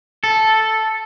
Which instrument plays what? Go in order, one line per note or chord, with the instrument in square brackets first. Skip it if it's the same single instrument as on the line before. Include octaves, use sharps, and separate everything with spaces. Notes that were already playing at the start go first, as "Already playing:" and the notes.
[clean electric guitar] A4